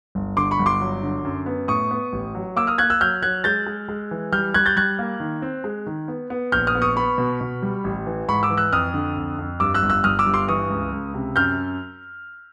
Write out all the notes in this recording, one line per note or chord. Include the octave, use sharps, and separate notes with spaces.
G1
D3 C6 D6
B5 C#6
G1
C6 D6
F#3
D3
F#2
B3
A2 C#6 D#6
B3
A1
F#3
A#3 D6 E6
D#6 F6
A#3 F#6 G#6
E6 F#6
F#3 F6 G6
F#3 F#6 G#6
G#3 G6 A6
G#3
G#3
E3
G3 F6 G6
G3 F#6 G#6
G6 A6
G3 F#6 G#6
A#3
D#3
C4
G#3
D#3
B3
B3
A#1 F6 G6
D#6 F6
B3
C#6 D#6
B3 B5 C#6
B2
B2
G3
A1
E3
G#2 B5 C#6
D6 E6
E3
E6 F#6
F2 D#6 F6
D3
F2
F2
G2 D6 E6
E6 F#6
G1
E6 F#6
G1 D#6 F6
D6 E6
G2
C6 D6
E3 C#6 D#6
C#2
C#2
C3
F#2 F6 G6